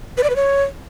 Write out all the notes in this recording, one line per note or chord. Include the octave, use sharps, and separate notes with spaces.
B4
D5
B4
C#5